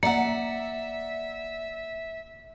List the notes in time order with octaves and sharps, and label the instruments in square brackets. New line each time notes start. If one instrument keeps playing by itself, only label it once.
[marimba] A#3 A#5 [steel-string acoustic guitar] D5 F#5 [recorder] E5